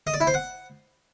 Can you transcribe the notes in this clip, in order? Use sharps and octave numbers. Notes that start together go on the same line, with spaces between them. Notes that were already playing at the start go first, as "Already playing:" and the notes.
D#5
D5
E4
C5
F#5